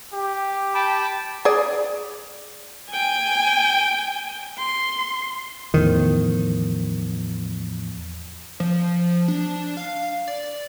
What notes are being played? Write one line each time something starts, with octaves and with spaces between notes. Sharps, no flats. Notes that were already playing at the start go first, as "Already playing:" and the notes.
G4
G5 A5 B5
G#4 D5
G5 G#5
C6
E2 A2 D#3 F3
F3
D4
F5
D5